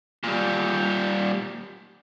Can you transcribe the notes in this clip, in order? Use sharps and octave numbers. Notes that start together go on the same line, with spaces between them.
A#2 G3